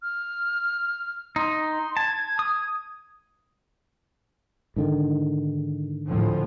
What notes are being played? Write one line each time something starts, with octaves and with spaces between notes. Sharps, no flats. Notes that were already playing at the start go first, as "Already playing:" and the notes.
F6
D#4 C6
C6
A5 G#6
D#6
G#2 D3 D#3
D2 A2 F3